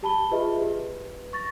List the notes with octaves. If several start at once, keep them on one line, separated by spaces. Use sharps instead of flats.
G4 A5 B5 G7
F4 G4 G#4 B4 D#5 E5
G4 B4
C#6 A6 A#6